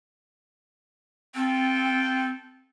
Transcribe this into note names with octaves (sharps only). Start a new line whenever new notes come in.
C4 F4 A4 G5